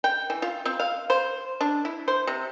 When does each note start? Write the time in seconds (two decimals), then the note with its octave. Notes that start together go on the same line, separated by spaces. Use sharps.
0.04 G5
0.30 E3
0.42 F4
0.65 C4
0.80 F5
1.10 C5
1.61 D4
1.85 E4
2.08 C5
2.27 C3